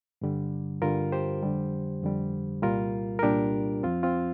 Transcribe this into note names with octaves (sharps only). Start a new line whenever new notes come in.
G2 D3 G3
G2 D3 G3 F4 A#4
G4 C5
F2 D3 G3
F2 D3 G3
C2 A#2 G3 F4 A#4
A#4
C2 A#2 G3 D4 G4
F2 F3 C4 F4
C4 F4